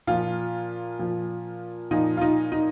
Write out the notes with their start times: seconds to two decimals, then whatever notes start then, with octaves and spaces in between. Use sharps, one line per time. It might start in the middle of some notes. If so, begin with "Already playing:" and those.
0.07 A#2 F3 F4
0.99 A#2 F3
1.91 A#2 F3 D#4
2.17 F4
2.21 D#4
2.52 D#4